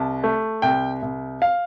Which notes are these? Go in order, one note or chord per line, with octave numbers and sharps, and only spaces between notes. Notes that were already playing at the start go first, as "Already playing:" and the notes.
Already playing: C2 A5
A3
C2 G5
C2
F5